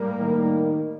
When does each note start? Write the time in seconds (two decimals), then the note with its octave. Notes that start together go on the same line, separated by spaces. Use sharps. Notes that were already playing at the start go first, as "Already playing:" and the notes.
Already playing: A2 G3 A#3
0.20 D#3